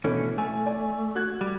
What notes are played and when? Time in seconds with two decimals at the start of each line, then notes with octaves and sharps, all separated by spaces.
0.04 B2 D3 E3 A3 C#4
0.38 A3 G#5
0.66 D5 G#5
1.15 F#4 F#6 G#6
1.41 G3